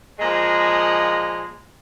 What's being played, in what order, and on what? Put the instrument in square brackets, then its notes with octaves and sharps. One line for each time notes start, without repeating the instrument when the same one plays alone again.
[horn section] A#2 F3 G#3